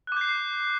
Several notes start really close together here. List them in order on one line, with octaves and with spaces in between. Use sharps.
F#6 D6 G6 C7